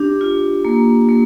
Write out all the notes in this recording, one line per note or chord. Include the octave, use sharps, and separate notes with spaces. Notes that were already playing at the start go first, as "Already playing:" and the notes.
Already playing: D4 G4
F4
A#3
A#3